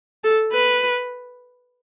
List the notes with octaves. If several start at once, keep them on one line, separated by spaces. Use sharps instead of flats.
A4
B4